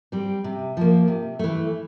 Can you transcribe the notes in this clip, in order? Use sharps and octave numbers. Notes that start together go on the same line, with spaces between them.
G3 C4
C3
F3 A#3
C3
E3 A3